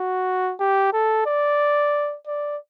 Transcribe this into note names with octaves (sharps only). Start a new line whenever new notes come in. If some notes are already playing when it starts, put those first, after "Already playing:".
Already playing: F#4
G4
A4
D5
D5